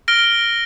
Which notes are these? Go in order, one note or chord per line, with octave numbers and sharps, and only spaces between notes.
F6 A#6 D7 G7